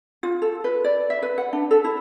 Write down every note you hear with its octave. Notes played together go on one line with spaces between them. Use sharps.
F4
A4
B4
D5
E5
B4
F#5
D4
A4
E4